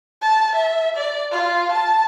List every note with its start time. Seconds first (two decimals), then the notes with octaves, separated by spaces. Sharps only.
0.22 A5
0.56 E5
0.97 D5
1.32 F4
1.72 A5